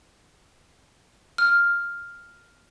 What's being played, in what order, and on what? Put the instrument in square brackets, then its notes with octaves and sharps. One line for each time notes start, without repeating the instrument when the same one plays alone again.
[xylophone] F6